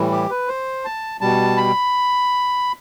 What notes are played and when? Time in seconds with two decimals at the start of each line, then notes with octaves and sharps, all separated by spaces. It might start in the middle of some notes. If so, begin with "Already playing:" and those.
Already playing: A2 E3 G3
0.12 G4
0.30 B4
0.48 C5
0.85 A5
1.21 B2 G3 A5
1.57 B5